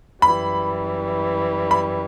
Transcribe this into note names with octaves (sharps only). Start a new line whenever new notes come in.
F#2 E3 G3 B5
B5